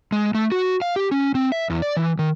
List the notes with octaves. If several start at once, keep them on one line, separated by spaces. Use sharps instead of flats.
G#3
A3
F#4
F5
G4
C#4
C4
E5
E2
D5
E3
D#3